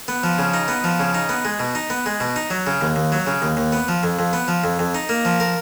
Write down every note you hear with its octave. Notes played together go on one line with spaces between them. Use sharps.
B3
F3
C#3
D#4
B3
F3
C#3
D#4
B3
G#3
B2
D#4
B3
G#3
B2
D#4
F#3
C#3
D#2
D#2
F#3
C#3
D#2
D#2
B3
F3
F2
F2
B3
F3
F2
F2
D#4
A#3
F3
A#4